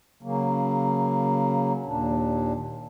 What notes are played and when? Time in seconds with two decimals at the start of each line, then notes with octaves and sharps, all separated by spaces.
0.22 C#3 F#3 A#3
1.85 D#2 A#2 D4